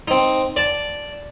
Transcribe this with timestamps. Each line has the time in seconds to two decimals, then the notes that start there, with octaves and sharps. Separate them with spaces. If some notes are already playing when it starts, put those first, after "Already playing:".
0.08 C4 D#4
0.56 D5 A5